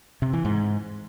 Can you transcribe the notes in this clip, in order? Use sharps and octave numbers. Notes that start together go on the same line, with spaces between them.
C3
E3
G#2